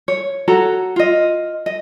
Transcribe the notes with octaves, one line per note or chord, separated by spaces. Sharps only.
C#5
F#4 A4 C#5 A#5
F4 D#5
D#5